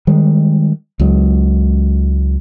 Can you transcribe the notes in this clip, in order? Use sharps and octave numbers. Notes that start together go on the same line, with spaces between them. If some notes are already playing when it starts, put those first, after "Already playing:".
D#3 G3 G#3
C#2 F#3 G#3